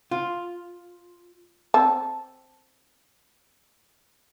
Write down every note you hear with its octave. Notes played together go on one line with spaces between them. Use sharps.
F4
C4 A5